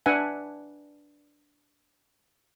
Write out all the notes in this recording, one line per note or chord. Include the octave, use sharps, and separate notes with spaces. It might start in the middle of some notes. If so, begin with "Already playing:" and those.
D4 B4 E5 F#5 G#5